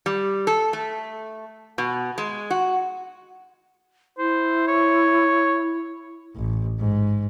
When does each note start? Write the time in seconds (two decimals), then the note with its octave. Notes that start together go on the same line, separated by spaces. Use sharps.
0.06 G3
0.47 A4
0.73 A3
1.78 B2
2.18 G#3
2.50 F#4
4.18 E4 C5
4.68 C#5
6.36 A1
6.80 G#2